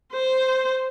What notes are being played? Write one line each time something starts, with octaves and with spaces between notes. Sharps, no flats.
C5